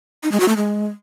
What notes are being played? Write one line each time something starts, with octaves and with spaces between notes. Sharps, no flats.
D#4
G#3
F#4
A3
G#3